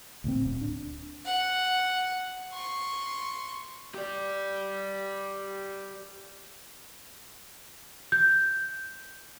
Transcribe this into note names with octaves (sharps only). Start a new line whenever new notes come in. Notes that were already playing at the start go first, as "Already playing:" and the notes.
D2 A#2 C4
D1
D4
F#5
C6 C#6
G4 D5
G6